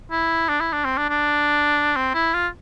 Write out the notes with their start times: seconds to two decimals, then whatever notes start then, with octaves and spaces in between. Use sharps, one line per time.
0.11 E4
0.48 D4
0.60 E4
0.72 D4
0.85 C4
0.97 D4
1.10 D4
1.96 C4
2.14 E4
2.34 F4